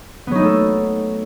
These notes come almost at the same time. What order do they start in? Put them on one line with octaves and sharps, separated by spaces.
B3 F#3 D#4 A3 A4